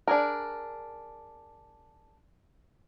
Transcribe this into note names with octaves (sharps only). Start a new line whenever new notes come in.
D4 G#4 A#4